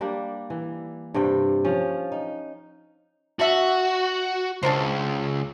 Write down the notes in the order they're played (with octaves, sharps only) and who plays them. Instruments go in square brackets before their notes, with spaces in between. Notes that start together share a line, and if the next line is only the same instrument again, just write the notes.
[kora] G3 A#3 D4
E3
G2 C3 G3 G5
F3 C#4 F5
D#4
[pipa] D4 E5 [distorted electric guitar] F#4
[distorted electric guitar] C#2 [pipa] D4 A#4 C5